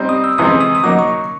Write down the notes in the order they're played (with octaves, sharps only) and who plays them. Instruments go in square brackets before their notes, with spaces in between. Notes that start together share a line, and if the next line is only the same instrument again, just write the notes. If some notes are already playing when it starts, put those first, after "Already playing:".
Already playing: [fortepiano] G3 C4 D#4
[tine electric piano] D#6
E6
[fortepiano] C3 E3 G#3 C4 [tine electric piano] D#6
[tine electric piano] D#6
D#6
[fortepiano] F#3 A#3 D#4 [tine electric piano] D6
[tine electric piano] C#6